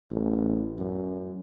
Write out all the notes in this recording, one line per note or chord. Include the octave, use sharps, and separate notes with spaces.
A1
F#2